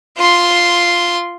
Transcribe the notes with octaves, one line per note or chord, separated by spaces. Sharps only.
F4 C6